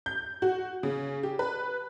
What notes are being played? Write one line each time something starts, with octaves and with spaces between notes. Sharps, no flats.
G6
F#4
C#3
G4
B4